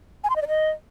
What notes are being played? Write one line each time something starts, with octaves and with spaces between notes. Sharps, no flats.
G#5
C6
D#5
D5
D#5